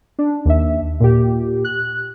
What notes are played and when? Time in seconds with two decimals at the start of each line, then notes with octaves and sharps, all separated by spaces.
0.19 D4
0.45 D#2 E5
1.00 A#2 G4
1.65 F#6